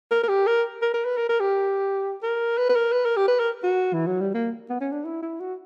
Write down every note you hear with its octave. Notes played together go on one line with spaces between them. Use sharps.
A#4
A#4
G4
A#4
A#4
A#4
B4
A#4
A#4
G4
A#4
B4
B4
A#4
B4
A#4
G4
B4
A#4
F#4
E3
F#3
G3
A#3
B3
C#4
D4
E4
E4
F#4